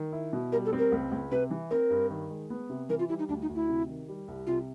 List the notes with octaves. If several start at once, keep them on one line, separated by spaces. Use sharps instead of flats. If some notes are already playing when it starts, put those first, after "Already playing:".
Already playing: D#3
E4
B2
G3 A#4
A4
C4
A#4
C#2
C#2
C3 B4
E3
C4 A#4
G2
D#3
G#3
B3
C3
E3 A#4
F4
G3 E4
D#4
D2 D4
D#4
D2
E4
C3
D#3
G3
C2
C3 F4